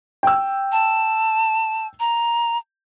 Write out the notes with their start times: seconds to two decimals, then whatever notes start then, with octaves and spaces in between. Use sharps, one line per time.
0.23 G5 E6
0.72 A5
2.00 A#5